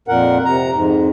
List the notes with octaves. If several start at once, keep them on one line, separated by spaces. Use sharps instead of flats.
F2 A#2 A#4 F#5
C3 A#5
F2 G#2